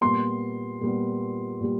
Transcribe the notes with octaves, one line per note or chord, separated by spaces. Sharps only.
A#2 G3 B3 C6
A#2 G3 B3
A#2 G3